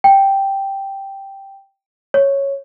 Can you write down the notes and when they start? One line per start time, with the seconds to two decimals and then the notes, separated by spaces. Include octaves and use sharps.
0.04 G5
2.14 C#5